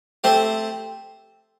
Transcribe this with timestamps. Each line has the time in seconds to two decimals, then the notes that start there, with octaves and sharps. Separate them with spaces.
0.24 A3 C4 G4 C5